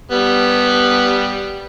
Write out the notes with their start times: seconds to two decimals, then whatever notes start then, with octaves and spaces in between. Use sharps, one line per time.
0.11 G3 B3